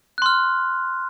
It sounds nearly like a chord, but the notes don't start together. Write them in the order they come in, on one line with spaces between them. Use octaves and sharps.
F#6 C6 F6